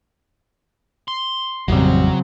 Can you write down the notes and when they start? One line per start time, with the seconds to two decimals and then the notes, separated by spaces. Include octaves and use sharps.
1.08 C6
1.68 A1 F2 C#3 F#3 G3 C4